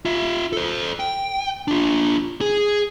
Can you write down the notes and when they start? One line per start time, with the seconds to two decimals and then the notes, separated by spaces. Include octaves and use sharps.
0.05 F4 E5
0.53 A4 C5
1.00 G5
1.68 D4 F4
2.41 G#4